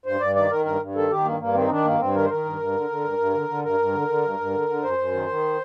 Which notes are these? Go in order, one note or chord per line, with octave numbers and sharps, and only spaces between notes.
G2 C5
G2 D5
D#3 D5
D#3 A#4
G2 A#4
G2
D#3 A4
D#3 G4
G2 A#3
G2 A#3
D#3 C4
D#4
D#3 D4
G2 A#3
G2 C4
D#3 A#4
C5
D#3 A#4
G2
G2
D3
D3
G2
G2
D3
D3
G2 A#4
G2
D3
D3
G2
G2
D3
D3
F#2 C5
F#2
D#3
D#3